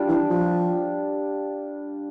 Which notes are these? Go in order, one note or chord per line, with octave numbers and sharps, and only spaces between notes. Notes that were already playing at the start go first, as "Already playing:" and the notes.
Already playing: G3 D4 F4
E3
F3